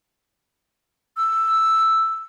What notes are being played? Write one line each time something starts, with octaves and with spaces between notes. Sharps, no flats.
E6